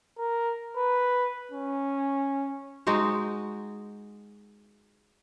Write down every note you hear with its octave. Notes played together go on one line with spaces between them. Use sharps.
A#4
B4
C#4
G#3 D#4 F#4 C5